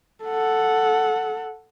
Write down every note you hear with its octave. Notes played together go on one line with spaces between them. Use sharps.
A4 F#5